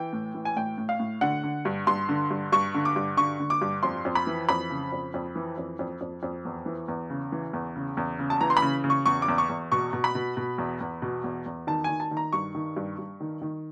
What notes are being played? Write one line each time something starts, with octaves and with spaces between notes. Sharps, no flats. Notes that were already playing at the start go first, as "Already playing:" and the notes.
Already playing: E3 G5
A2
E3
G#5
A2 G5
A2
F5
A2
D3 F#5
D3
G2
G2 C6
D3
G2
G2 C#6
D3
D6
G2
D3 C#6
D3
D6
G2
F2 C6
F2
B5
E3
F2 B5
C#3
F2
F2
E3
F2
F2
F2
F2
E2
E3
E2
C#3
E3
E2
C#3
E2
C#3
A5
E3 A#5
C6
B5
C#3
C#3
C#6
E2 C#6
D6
E2
C#6
E2
B2 C#6
B2
B5
B2
B2
E2
E2
B2
E2
E2
D#3 A5
D#3 G#5
A5
D#3
A#5
G2 C#6
D#3
G2
G2
D#3
D#3